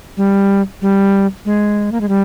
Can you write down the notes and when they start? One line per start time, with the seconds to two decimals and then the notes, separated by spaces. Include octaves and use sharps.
0.17 G3
0.82 G3
1.45 G#3
1.92 A#3
2.01 G#3
2.09 G3